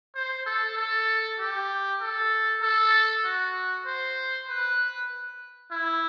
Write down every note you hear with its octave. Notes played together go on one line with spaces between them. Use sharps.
C5
A4
A4
G4
A4
A4
F#4
C5
B4
E4